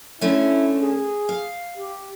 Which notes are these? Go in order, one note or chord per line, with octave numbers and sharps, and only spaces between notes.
D3 A3 C#4 E4
G#4
F5
G4